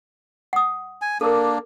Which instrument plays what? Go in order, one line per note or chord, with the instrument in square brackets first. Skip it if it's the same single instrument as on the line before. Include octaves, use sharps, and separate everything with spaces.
[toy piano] F#5 D#6
[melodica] G#5
[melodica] A#3 D4 [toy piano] A4 A#4